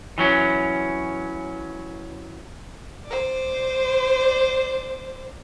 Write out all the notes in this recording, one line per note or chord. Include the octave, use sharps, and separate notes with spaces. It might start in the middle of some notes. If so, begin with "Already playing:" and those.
E3 F#3 C#4
C5 D5